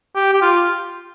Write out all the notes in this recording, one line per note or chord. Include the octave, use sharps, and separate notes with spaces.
G4
G4
F4